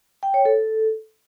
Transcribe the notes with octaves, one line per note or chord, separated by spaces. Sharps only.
G5
C#5
A4